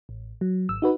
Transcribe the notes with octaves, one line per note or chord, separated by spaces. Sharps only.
A1
F#3
G#1 E6
D#4 F#4 B4